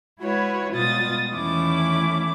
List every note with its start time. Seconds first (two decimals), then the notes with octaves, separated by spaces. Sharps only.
0.20 G#3 E4 F#4 B4 C#5
0.74 B2 G3 G#3 F4 D#6 A6
1.34 E2 D#3 A3 C#4 E4 D6